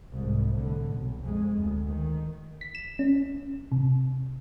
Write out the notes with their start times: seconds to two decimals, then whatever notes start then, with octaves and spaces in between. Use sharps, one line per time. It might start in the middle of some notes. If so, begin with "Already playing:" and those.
0.11 C2 G#2
0.51 A2 D3
0.89 B1
1.21 F2 G#3
1.56 D2
1.87 D#3
2.61 B6
2.75 E7
2.99 C#4
3.72 C3